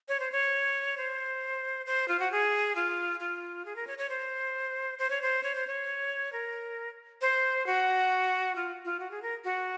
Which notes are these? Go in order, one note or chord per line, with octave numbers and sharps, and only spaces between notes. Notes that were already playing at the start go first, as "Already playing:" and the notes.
C#5
C5
C#5
C5
C5
F4
F#4
G#4
F4
F4
G#4
A#4
C#5
C#5
C5
C5
C#5
C5
C#5
C5
C#5
A#4
C5
F#4
F4
F4
F#4
G#4
A#4
F#4